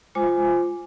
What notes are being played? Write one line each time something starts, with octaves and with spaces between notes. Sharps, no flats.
G#3 F4 C5 G#5 D6